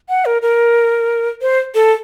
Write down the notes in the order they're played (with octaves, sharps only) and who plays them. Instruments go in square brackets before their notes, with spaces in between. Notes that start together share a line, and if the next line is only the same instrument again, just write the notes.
[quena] F#5
A#4
A#4
C5
A4